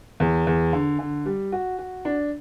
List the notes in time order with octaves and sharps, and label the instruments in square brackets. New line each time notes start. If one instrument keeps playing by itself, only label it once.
[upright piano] E2
E2
D3
D3
G3
F#4
F#4
D4